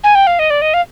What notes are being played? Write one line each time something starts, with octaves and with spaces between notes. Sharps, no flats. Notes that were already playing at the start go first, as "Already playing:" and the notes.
G#5
G5
F5
D#5
D5
D#5
F5